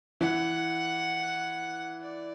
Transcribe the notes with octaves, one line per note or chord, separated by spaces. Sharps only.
E3 F#5
D5